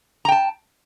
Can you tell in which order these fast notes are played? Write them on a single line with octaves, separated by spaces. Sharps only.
A#5 G5 A5